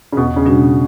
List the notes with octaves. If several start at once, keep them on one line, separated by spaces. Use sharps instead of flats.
C#3
E2 B2
C#3
B2 G3 D4 F#4